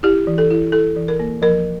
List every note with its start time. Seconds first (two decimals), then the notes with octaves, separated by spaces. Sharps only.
0.03 E4 G4
0.27 E3
0.38 A4
0.50 E4
0.72 E4 A4
0.96 E3
1.08 A#4
1.19 A#3
1.42 F3 A#4